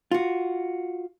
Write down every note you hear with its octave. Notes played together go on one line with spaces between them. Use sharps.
F4 F#4